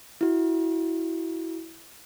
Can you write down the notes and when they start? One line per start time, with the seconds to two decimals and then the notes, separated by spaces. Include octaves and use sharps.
0.21 E4 F#4